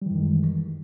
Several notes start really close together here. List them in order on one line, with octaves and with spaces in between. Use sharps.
G3 E3 F#2 D#3 G#3